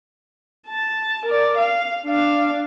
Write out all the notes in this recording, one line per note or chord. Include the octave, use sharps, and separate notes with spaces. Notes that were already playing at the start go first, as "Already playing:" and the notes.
A5
A#4 D5
F5
D4 F5